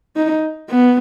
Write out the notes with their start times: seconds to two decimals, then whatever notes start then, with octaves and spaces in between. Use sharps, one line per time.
0.16 D#4
0.70 B3